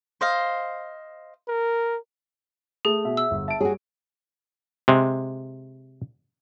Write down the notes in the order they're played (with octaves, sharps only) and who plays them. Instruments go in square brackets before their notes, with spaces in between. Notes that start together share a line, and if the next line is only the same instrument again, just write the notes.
[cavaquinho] C5 D#5 F5
[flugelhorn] A#4
[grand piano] A3 [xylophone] G#4
[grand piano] B2 [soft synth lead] E5
[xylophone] E6
[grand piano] G1
[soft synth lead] E5 [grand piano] A5 D7
[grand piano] G3 [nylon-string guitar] F#4 G#4 [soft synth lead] C#5
[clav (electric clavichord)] C3 G#3